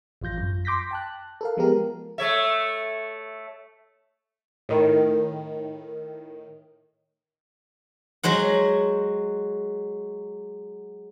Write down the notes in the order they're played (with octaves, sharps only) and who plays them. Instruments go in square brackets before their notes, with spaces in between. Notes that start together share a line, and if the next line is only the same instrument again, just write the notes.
[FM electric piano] A1 F2 F4 G6 A#6
F#2
C6 D6 G6 A#6 B6
G5 A5 F#6
A4 A#4 F5
F3 G#3 B3 G4 A#4
[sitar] A3 C#5 E5
[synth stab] A2 D#3
[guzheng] F#3 G#3 C5 F#5